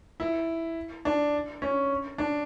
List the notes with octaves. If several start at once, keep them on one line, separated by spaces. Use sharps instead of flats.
E4
D4
C#4
D4